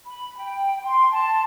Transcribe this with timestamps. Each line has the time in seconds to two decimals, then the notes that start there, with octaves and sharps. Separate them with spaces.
0.06 B5
0.39 G5
0.83 C6
1.12 A5